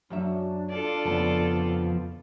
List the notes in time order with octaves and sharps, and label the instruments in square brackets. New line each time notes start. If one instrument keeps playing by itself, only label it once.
[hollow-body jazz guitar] F#2 F#3 E5 [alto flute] D4
[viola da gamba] F4 A4 D5
[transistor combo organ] F2 [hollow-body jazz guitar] C#3 B3 A5